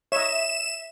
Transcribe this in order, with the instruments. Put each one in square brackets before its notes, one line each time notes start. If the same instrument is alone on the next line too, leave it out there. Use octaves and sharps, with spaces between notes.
[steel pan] C#5 D#5 [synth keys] E5 [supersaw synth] E7